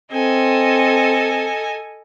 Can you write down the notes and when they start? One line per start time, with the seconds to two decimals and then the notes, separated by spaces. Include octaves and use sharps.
0.12 C4 A4 D#5 G#5